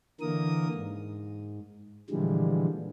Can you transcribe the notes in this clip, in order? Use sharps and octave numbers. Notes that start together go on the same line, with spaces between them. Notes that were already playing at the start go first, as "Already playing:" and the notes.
D3 E3 A#3 A#4 D#6
G#2
A#2 D3 E3 F3 G3 G#3